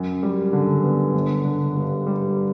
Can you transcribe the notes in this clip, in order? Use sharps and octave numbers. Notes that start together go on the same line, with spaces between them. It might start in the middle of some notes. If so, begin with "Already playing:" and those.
Already playing: F#2
G3
D3
B3
G1
D3
G2
G3